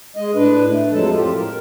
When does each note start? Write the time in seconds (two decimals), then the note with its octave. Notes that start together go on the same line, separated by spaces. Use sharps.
0.16 G#3 D#5
0.35 A2 D4 B4
0.70 A3
0.92 F2 F3 F#3 G#3 A4 A5
1.14 A2 F4 G4
1.37 A#4